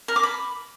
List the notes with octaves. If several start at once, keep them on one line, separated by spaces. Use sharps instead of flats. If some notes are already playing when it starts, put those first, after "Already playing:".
A#4
D6
B5